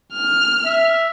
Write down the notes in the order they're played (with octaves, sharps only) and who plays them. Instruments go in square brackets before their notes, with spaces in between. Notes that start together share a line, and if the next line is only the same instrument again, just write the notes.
[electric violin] F6
[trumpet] E5